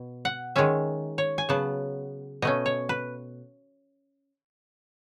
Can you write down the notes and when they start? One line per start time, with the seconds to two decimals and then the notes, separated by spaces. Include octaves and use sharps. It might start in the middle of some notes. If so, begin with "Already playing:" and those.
Already playing: B2
0.25 F#5
0.56 D#3 G#3 C#4 E5
1.18 C#5
1.38 G#5
1.49 C#3 F#3 B3 A5
2.42 B2 A3 C#4 D#5
2.66 C#5
2.89 B4